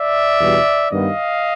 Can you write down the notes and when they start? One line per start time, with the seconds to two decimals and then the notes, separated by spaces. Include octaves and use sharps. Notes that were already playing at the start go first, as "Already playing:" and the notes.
Already playing: D5 E5
0.39 E2 B2 G3
0.91 G2 D#3 G3 B3 D#5 F5